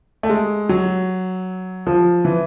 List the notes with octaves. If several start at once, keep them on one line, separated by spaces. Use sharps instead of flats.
A3
G#3
F#3
F3
E3